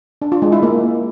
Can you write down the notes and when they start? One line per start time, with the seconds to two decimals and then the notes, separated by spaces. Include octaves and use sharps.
0.22 D4
0.32 F4
0.42 G#3
0.52 E4
0.63 A#3